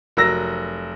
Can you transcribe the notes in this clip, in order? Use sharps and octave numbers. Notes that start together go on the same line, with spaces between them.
F1 F#3 A#4 E6 A#6